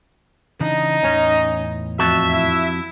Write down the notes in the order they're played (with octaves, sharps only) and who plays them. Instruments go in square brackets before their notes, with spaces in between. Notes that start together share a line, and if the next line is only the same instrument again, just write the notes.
[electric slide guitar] C#3 E3 D4 [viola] D#4 D#5
[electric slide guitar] E2 A2 C#5 [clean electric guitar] C#4
[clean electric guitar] F2 F#4 A5 [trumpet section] E5
[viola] E4